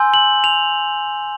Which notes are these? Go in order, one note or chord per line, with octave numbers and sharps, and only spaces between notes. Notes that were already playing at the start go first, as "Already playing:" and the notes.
Already playing: G#5 C6 E6 G6
F#7
F7